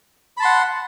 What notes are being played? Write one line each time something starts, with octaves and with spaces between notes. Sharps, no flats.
F#5 A5 B5 C6